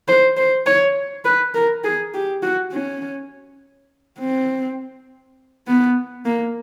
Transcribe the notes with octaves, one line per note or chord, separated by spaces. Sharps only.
C5
C5
C#5
B4
A#4
G#4
G4
F#4
C#4
C4
B3
A#3